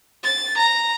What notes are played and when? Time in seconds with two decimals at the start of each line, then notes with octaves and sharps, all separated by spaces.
0.23 A6
0.57 A#5